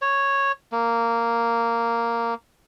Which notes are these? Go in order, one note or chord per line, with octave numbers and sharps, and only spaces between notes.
C#5
A#3